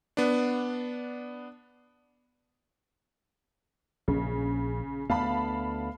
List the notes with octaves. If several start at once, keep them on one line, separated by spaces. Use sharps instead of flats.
B3 D4
A#1 C#3
D2 A3 B3 F5 A5 B5